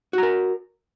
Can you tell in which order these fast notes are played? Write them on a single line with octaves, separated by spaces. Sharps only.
F#4 A#5 A#4